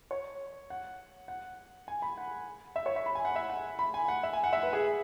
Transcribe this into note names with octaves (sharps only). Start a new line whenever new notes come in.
C#5
F#5
F#5
G#5
B5
F#5
E5
C#5
E5
B5
G#5
F#5
E5
F#5
B5
G#5
F#5
E5
G#5
F#5
E5
B4
G#4